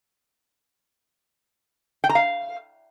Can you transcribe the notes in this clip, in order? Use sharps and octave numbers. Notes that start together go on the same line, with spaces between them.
G5
A#5
F5